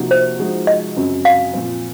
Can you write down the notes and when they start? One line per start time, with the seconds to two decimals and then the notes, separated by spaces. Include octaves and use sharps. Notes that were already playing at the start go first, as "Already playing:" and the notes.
Already playing: C3 F3 A#3 D#4 F#4
0.11 C5
0.39 F3 G#3 D#4 F#4
0.67 D#5
0.96 F#2 C#3 F#3 C4
1.25 F5
1.53 A#2 F3 C4